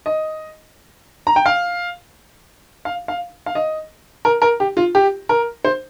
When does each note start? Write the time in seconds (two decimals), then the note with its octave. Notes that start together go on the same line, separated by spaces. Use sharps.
0.06 D#5
1.27 A#5
1.36 G5
1.46 F5
2.85 F5
3.08 F5
3.46 F5
3.55 D#5
4.25 A#4
4.42 A#4
4.60 G4
4.77 F4
4.95 G4
5.29 A#4
5.65 C5